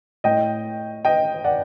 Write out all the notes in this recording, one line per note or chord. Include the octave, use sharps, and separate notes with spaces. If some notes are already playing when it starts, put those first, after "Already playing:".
A2 D#5 G5
D#5 G5
D5 F#5